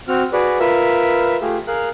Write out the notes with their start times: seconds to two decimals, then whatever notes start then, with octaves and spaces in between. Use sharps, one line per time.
0.08 C4 F#4 F6
0.33 F#4 G#4 B4 D5
0.60 F4 A#4 B4 E5
1.41 A3 F4 G4 G#4
1.67 G#4 A#4 F5 F#6